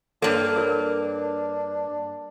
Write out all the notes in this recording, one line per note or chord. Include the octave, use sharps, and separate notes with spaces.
G2 A#3 D4 A4 C#5
A#4 C#5